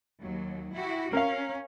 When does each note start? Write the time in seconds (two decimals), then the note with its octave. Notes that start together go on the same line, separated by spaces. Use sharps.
0.22 D#2 F#3
0.74 E4 F#4 G4
1.13 C#4 A#4 F5